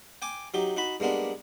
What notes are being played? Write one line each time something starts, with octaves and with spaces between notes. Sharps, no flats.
G5 G#5 D6
F#3 D#4 G4
D#4 F#4 B5
G2 G#3 A#3 B3 D4